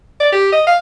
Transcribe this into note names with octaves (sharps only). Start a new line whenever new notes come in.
D5
G4
D#5
F5